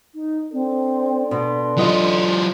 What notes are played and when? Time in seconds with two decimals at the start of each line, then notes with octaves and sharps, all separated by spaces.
0.15 D#4
0.53 C4 D4 A4 D5
1.31 B2 C6
1.77 F#3 E4 F4 D#5